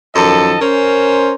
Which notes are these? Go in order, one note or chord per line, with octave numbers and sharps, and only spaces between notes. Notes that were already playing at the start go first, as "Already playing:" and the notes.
F#2 D#3 F3 A4 D#5 A5
C#4 A#4 C5